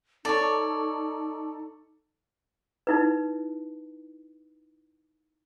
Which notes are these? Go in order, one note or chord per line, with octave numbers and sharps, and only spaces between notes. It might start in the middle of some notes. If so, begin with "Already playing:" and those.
D#4 A4 C#5 D5
D#4 E4 B4